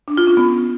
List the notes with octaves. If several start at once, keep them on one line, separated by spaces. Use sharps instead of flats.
D4
F4
C#4
B3